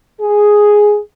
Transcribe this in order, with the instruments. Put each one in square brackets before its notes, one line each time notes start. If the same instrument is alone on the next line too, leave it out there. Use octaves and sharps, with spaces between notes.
[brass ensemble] G#4